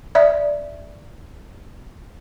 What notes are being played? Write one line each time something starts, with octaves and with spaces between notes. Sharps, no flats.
D5 E5